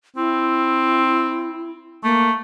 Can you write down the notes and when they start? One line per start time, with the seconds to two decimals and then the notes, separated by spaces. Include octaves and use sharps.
0.16 C4 E4
2.04 A3 A#3